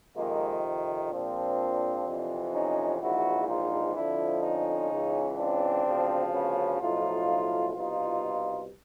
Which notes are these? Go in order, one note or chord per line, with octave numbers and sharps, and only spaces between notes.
F2 C3 D#3 G#3 A#3
A#1 A#2 F3 C4 D4
F2 C3 E3
C#4 D#4
A#1 G#2 E3 E4 F#4
D#4 F4
F2 D3 F3 D4 E4
C#4 D#4
C#2 C#3 E3
C4 D4
D2 C#3 F3
B3 C#4
B1 A2 F3 D#4 F4
C2 B2 D#4 F4